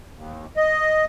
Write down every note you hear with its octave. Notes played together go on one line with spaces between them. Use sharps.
D#2
D#5